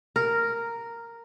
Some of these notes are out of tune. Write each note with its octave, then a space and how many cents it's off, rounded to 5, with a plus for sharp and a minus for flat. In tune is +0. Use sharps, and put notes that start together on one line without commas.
A#4 -5